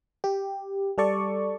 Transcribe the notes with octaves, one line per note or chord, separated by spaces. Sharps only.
G4
G3 A4 D5 C#6